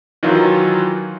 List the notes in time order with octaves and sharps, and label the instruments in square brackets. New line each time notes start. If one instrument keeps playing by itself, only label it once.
[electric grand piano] D#3 E3 F#3 D#4 F4